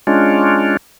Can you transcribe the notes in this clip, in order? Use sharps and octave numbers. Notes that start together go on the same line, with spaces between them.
G#3 C#4 D4 F4